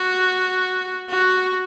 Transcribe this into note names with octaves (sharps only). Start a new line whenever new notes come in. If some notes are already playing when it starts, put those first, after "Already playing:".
Already playing: F#4
F#4